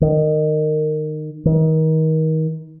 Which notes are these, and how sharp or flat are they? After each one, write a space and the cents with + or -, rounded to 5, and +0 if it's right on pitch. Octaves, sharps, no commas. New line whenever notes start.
D#3 -20
D#3 +30